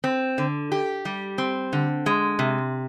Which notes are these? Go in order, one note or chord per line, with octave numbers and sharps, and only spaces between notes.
C4
D3
G4
G3
C4
D3
G#3
C3